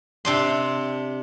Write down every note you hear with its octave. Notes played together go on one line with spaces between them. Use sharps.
C3 D4 C6